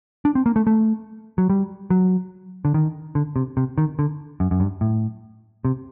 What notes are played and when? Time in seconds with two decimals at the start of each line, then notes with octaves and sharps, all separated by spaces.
0.25 D4
0.35 C4
0.46 A#3
0.56 A3
0.67 A3
1.38 F#3
1.50 G3
1.90 F#3
2.65 D3
2.74 D#3
3.15 D3
3.36 C3
3.57 C3
3.78 D#3
3.99 D3
4.40 F#2
4.51 F#2
4.60 G2
4.81 A2
5.65 C3